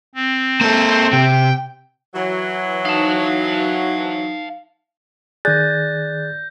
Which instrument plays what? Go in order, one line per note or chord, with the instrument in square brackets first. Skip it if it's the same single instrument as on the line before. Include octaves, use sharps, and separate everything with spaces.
[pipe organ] C4
[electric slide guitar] A#3 A4 [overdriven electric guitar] C5
[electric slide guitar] C3 [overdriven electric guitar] G5
[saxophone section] E3 F#3
[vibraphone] D#4 [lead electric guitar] F5 A5
[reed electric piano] D#3 G#4 [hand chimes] D5 F#6 A6 [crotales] G6 A#6